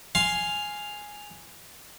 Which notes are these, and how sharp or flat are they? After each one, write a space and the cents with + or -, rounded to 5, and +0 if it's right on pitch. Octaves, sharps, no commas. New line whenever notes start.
F5 +0 G#5 +0 C6 +0